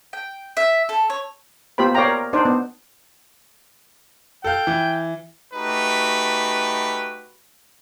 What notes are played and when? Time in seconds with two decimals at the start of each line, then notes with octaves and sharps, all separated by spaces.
0.13 G5
0.57 E5
0.89 A4
1.10 C#5
1.78 A#3 B3 F4 G4 C5 B5
1.95 A#4 C#5 D5 F5 G5 A#5
2.08 A#4
2.33 D4 D#4 C5 D5
2.45 B3
4.44 A4 F5 G5
4.67 E3
5.54 A3 D#4 F#4 G4 B4